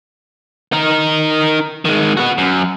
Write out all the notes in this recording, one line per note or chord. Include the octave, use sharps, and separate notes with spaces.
D#4 A#4
D#3 G#3
B3 F#4
F#2